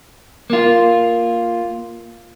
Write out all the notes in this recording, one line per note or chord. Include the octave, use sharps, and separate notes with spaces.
A#3 F4